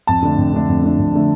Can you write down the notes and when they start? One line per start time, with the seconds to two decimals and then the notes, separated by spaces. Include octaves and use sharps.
0.07 F2 A5
0.23 D3 A3 D4
0.38 F2
0.53 D3 A3 D4
0.68 F2
0.83 D3 A3 D4
0.99 F2
1.13 D3 A3 D4